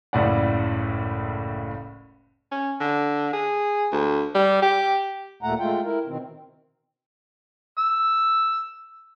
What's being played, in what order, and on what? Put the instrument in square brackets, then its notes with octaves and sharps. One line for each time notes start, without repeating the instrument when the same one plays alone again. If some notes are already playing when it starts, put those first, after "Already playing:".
[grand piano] F#1 C#2 A2 D5 F#5
[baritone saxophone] C#4
D3
G#4
D2
G3
G4
[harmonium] D#2 A#2 A3 F#5 A#5
G#3 A3 F4 G5
E4 A#4
B2 D#3 C4
[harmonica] E6